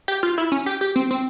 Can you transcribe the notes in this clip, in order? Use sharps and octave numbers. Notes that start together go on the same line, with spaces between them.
G4
F4
E4
C#4
G4
G4
C4
C4